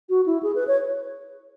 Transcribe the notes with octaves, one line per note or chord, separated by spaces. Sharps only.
F#4
E4
G#4
B4
C#5